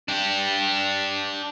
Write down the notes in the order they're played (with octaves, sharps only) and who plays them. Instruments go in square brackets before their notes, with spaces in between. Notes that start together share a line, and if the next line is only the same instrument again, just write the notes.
[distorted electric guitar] D4 G4